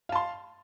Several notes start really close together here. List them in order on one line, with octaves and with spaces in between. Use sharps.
F5 A5 C6